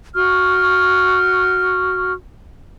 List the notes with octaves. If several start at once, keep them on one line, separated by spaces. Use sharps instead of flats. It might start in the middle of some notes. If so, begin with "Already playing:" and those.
F#4 C#6 F6